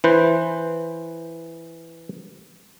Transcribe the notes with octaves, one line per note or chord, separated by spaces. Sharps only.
E3 B4 C5